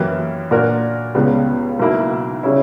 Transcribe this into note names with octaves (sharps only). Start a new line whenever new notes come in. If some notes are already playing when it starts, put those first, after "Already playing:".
Already playing: F#2 E3 A#3 E4 G4
A#2 A#3 D4 F#4 A#4
C#2 C#3 G3 B3
B1 B2 A#3 E4
C#3 G3 C#4 E4